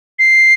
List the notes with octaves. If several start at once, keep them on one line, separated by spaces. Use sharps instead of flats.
C7